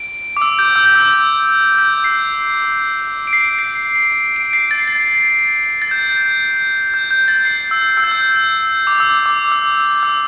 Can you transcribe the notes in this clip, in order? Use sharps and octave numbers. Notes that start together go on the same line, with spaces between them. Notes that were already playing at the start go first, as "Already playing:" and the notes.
Already playing: D7
D6
E6
G6
E6
G6
E6
G6
C7
D7
C7
C7
D7
C7
A6
C7
A6
A6
G6
G6
G6
A6
C7
E6
E6
G6
E6
D6
E6
D6
E6
E6